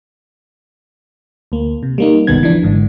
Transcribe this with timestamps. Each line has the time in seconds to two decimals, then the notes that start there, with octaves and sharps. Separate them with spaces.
1.52 D2 A#3
1.83 C3
1.98 G3 A#3 D#4
2.27 G1 C#2 B2 D#3 B3 G#6
2.43 E3 F3 D4
2.63 G#1 G#2 D3